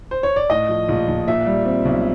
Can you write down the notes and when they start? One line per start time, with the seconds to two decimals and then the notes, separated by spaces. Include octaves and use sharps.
0.11 C5
0.23 C#5
0.36 D5
0.50 A2 D#5
0.69 F3
0.89 A#1
1.08 A#1
1.27 A#2 E5
1.46 G3
1.66 C4
1.85 B1